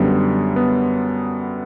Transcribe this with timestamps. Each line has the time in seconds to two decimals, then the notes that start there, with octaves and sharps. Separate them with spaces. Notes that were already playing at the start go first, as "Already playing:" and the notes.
Already playing: F#2 D3 G3 B3
0.56 B3